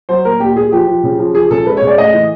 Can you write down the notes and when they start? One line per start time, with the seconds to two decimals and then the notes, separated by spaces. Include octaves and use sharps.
0.09 F#3 C5
0.25 A#2 A#4
0.40 A#2 G4
0.57 A#2 G#4
0.72 F3 G4
0.88 F3
1.03 C#3
1.19 F3
1.34 F3 G#4
1.51 C#3 A4
1.66 G#3 B4
1.77 C#5
1.82 C#3
1.87 D5
1.98 A2 D#5
2.14 E3